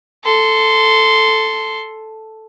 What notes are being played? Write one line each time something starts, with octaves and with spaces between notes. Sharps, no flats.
A4 C6